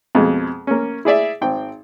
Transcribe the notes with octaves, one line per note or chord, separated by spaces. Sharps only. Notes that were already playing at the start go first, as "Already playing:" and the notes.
F2 B2 G#3
A#3 C#4
E4 G#4 D5 E5
G#1 C4 G5